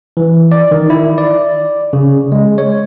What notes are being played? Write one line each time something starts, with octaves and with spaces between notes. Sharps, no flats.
E3
D5
D#3
E4
D5
C#3
G#3
C#5